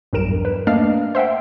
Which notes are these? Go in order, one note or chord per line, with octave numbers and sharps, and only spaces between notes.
B1 E2 G2 A#4 D7 E7
B4
A3 A#3 D4 D5 D#5 F5
C5 E5 F#5 G5